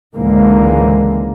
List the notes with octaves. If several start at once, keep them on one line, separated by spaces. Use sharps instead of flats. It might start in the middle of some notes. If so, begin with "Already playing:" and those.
C#2 G#2 D3 E3 A#3